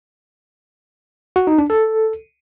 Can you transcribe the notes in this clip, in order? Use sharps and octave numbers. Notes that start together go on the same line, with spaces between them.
F#4
D#4
D4
A4